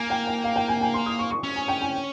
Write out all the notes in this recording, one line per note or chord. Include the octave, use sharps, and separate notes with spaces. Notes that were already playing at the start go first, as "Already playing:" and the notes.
Already playing: A#3 G#5
G5
G5
F5
G5
G#5
G#5
C6
D#6
C#6
C#6
C#4
G#5
G5
G#5